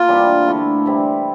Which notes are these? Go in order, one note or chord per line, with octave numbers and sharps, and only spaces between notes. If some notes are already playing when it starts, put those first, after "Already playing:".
Already playing: A#3 F4
C3 E3 G3 D4
D3 A3 E4
C3 E3 G3 C4